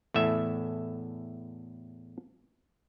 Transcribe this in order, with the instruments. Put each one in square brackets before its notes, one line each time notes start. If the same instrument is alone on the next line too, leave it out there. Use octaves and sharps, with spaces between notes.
[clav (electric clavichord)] E2 A2 A3 E5